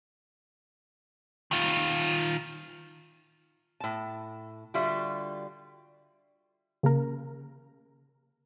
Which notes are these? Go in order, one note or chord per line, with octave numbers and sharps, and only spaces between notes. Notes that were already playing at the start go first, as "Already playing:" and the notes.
D#3 F4
A2 A5
D3 G3 F4 F#4 E5
C#3 A#3 A#4